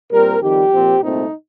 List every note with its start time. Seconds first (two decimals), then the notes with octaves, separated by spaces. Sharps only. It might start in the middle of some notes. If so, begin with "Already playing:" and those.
0.13 A#2 G3 C4 A#4
0.42 F2 D#3 G3 G4
0.72 A#2 F3 C4
1.01 C2 A#2 A3 C4 D#4